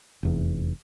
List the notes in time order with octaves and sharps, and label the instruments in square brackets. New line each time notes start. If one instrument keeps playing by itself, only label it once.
[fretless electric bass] F1 E2